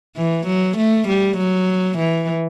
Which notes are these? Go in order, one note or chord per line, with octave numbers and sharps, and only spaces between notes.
E3
F#3
A3
G3
F#3
E3